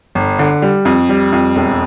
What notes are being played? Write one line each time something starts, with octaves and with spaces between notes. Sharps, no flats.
G1
D3
G3
F2
G3
F2
E1